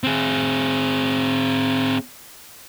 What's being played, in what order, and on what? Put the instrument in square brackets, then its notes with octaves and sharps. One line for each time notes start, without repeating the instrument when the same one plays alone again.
[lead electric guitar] C4 G#4